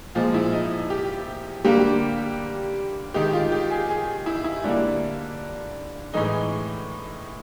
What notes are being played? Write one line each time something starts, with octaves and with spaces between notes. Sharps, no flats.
A#2 F3 G#3 F4
E4
D#4
G4
D3 G3 A#3 G4
D#3 G#3 G4
F4
G4
G#4
G#4
E4
E4
D3 G3 A#3 D4
A2 E3 G#3 D#4